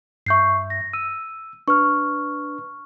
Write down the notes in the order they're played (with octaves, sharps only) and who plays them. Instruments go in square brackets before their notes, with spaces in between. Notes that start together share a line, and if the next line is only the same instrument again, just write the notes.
[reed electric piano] G2 E5 [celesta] C#6 G6 C7
[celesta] A#6
[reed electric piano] E6 [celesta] D#7
[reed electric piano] D4 B4 [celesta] C#6 F6